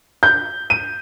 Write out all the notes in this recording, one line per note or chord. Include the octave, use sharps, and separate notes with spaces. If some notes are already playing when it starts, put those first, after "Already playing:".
G6
D#7